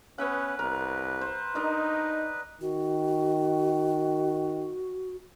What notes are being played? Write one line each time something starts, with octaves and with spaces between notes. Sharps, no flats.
B3 C#4 B4 E5 F#5
C2 A#4
C5
D4 D#4 A#4 D#5
D#3 F#4